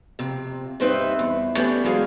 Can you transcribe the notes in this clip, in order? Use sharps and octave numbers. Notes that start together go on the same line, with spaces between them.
F2 C3
G2 G3 C4 D#4 B4 E5
E2
A3 B3 C#4 D4 G4
E3 F#3 G#3 G#4 F5